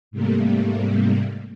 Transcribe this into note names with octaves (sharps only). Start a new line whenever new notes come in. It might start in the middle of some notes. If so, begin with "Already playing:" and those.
G#2 C3 G3 A3 A#3